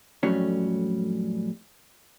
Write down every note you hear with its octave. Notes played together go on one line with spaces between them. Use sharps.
F2 A2 F#3 G3 C#4